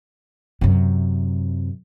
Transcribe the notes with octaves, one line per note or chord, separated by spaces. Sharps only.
F#2 C3